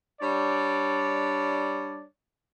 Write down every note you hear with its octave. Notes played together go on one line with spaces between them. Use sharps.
G3 D4 C#5 D5